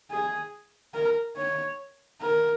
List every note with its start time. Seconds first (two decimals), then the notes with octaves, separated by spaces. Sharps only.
0.10 G#4
0.94 A#4
1.36 C#5
2.21 A#4